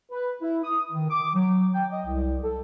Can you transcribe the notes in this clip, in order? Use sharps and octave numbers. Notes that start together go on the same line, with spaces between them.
B4
E4
D#6
D#3
D6
F#3
G5
D#5
C2
A4